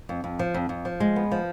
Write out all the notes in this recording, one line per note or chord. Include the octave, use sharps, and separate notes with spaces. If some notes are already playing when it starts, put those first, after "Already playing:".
F2
F2
F3
F2
F2
F3
G#3
B3
F3